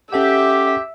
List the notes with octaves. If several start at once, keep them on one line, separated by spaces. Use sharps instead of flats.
C#4 G4 A4 E5 F#5